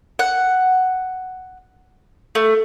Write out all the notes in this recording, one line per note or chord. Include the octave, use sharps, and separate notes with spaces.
F#5
A3